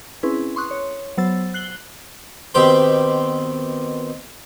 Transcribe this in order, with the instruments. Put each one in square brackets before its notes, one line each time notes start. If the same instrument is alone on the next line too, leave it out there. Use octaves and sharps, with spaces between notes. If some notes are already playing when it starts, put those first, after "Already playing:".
[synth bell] C4 C#4 E4 G#4 B4
C6 C#6 D#6 F#6
C#5
F#3 B3 C5 E6 A6
F#6 C7 F#7 G7
[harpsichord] B2 D#3 C4 G4 C5 B5